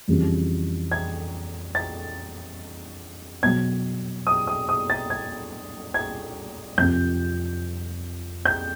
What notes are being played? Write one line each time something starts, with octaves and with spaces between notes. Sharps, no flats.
F2 C#3 E3 G3
G#6
A6
B2 F#3 G#6
D#6
D#6
D#6
A6
G#6
G#6
F2 C3 F3 G6
G6